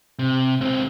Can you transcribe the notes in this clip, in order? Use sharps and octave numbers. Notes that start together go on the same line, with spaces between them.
C3
C#2 C4